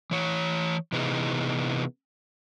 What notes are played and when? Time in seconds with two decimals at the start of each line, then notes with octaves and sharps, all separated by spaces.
0.11 E3 C#5
0.92 C3 E3 B3 D#4 G#4